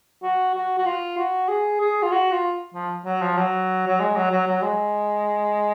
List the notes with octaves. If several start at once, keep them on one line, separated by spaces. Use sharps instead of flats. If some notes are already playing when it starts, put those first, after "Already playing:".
F#4
F#4
F#4
F4
F#4
G#4
G#4
F4
F#4
F4
F3
F#3
F3
F#3
F#3
G#3
F#3
F#3
F#3
G#3